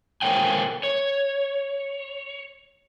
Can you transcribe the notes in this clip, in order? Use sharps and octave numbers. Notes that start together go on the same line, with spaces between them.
A4 A#4 C5 C#5 G5 G#5
C#5